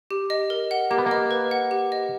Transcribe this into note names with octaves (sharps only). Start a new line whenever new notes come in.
G4
D#5
A#4
F#5
A#3 G4
B3
A#3
D#5
B4
F#5
G4
D#5